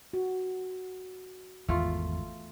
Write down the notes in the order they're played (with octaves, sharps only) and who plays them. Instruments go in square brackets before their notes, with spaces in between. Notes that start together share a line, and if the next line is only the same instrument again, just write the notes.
[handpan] F#4
[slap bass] G#1 [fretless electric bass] E2 [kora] A3 F4